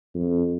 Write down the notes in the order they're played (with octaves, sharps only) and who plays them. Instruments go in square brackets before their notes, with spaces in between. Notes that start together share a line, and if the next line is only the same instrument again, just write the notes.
[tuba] F2